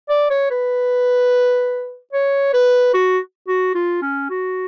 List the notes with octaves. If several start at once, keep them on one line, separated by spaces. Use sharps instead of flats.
D5
C#5
B4
C#5
B4
F#4
F#4
F4
C#4
F#4